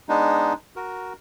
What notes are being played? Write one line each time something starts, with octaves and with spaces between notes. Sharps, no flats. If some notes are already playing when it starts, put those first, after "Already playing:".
G#3 B3 D4 D#4
F#4 A#4